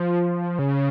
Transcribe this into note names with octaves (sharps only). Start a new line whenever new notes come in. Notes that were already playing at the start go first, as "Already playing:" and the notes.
Already playing: F3
C#3